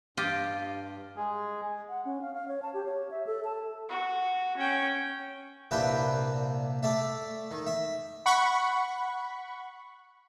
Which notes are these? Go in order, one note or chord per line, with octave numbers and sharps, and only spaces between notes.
G2 F4 G4 D#5
G#3 G#4
F#5
C#4
F5
F5
C#5
A5
G4
C#5
E5
A4
A5
F#4
C#4 G5
C2 A#2 D4 B4 E5 G5
A3 D5 E5
D#3
E5
F#5 B5 C#6